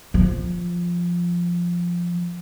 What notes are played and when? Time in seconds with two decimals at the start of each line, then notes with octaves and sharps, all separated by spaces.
0.14 F3